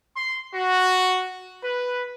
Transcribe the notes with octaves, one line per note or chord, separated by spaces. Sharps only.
C6
F#4
B4